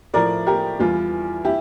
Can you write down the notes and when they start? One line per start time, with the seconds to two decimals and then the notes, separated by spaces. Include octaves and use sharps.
0.14 A2 F3 A#4 D5
0.46 G4 A#4
0.80 E2 E3 G3 F4
1.45 E4 G4